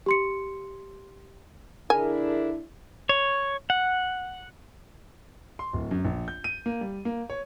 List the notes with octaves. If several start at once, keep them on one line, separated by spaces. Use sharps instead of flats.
G4 C6 C#7
D3 D4 E4 G#4 A#4 G#5
C#5
F#5
C6
D1
F#2
A#1
G6
D#7
A#3
G3
A#3
C#5